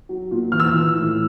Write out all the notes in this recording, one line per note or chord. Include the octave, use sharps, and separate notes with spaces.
F#3
A#2
E3 F6
E6
F6
E3
A2